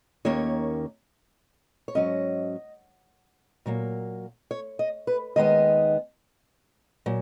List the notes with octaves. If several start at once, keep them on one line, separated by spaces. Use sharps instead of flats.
D#2 D#3 A#3 C#4 C#5
C#5
G#2 F#3 C#4 D#5
A#2 F#3 A#3
C#5
D#5
B4
D#2 D#3 G#3 B3 D#5
A#2 F#3